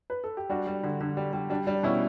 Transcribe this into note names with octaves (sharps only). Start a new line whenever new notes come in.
B4
A4
G4
G3 D4 F#4
G3
D3
D3
G3
G3
G3 D4
G3 D4
B2 C#4 E4